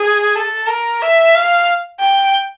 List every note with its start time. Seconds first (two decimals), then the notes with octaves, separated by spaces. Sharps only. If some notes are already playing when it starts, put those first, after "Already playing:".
Already playing: G#4
0.36 A4
0.68 A#4
1.02 E5
1.35 F5
1.99 G5